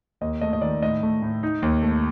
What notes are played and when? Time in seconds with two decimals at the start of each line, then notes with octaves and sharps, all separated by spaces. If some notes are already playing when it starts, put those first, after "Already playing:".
0.21 D#2 D#5
0.41 A3 D#5
0.53 D#5
0.61 D#3 D5
0.82 A2 D#5
1.03 A3
1.22 A2
1.43 D#4
1.62 D#2
1.82 A3